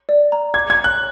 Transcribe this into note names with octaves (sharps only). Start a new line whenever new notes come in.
D5
A#5
D6 G#6
G#6
A#5
F#6